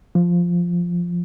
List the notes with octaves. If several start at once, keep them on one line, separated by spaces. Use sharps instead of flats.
F3